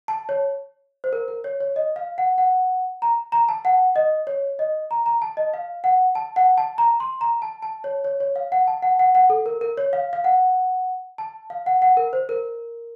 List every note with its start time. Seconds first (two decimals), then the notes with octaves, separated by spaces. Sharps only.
0.08 A5
0.29 C#5
1.04 C5
1.13 A#4
1.28 A#4
1.44 C#5
1.60 C#5
1.76 D#5
1.96 F5
2.18 F#5
2.38 F#5
3.02 A#5
3.32 A#5
3.49 A5
3.65 F#5
3.96 D#5
4.27 C#5
4.59 D#5
4.91 A#5
5.06 A#5
5.22 A5
5.37 D#5
5.54 F5
5.84 F#5
6.15 A5
6.36 F#5
6.58 A5
6.78 A#5
7.00 C6
7.21 A#5
7.42 A5
7.62 A5
7.84 C#5
8.05 C#5
8.20 C#5
8.36 F5
8.52 F#5
8.67 A5
8.83 F#5
8.99 F#5
9.15 F#5
9.30 A4
9.46 A#4
9.61 A#4
9.77 C#5
9.93 F5
10.13 F5
10.24 F#5
11.18 A5
11.50 F5
11.66 F#5
11.82 F#5
11.97 A#4
12.13 C5
12.29 A#4